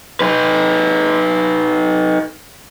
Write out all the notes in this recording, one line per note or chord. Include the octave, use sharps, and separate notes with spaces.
D#4 B4